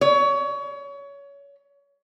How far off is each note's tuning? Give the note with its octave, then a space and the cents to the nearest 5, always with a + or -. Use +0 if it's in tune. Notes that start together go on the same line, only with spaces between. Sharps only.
C#5 +25